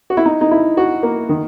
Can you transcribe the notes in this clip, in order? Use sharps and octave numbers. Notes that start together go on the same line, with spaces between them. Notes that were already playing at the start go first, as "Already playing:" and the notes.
F#4
E4
D#4
D#4
E4
F#4
A#3
D#3